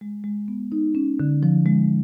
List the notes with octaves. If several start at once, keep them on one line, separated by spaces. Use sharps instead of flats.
G#3
G#3
B3
D#4
C#4
D3
F3
G#3